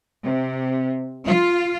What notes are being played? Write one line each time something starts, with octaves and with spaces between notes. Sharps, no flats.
C3
F4